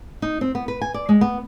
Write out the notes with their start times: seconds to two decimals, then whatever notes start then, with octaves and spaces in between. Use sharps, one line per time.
0.22 D#4
0.41 C4
0.55 B3
0.68 B4
0.82 G#5
0.94 D5
1.09 G#3
1.21 B3